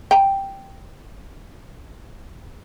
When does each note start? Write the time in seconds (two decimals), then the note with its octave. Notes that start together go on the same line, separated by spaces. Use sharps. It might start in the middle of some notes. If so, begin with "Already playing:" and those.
0.11 G5 A#5